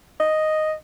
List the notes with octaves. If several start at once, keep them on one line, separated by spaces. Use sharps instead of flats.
D#5